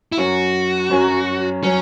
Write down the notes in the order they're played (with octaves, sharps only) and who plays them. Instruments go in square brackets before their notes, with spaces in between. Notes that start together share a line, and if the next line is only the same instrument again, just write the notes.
[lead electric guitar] E4
[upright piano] F#2 F#3 C#4 [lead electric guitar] F#4
[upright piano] F#2 F#3 C#4
[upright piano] F#3 [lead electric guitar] C#4